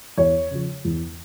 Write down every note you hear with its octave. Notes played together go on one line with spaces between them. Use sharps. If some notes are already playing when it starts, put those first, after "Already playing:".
E2 C#5
C#3 F3
E2